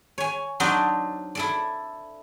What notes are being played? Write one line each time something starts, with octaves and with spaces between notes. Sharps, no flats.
C#5 G#5
F#3 C4 D4 D#4 D5
E4 A4 D5